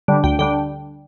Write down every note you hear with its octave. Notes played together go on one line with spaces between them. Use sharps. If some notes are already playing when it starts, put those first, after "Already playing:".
D3 G3 D4
D2 G5
D3 G3 D4 G5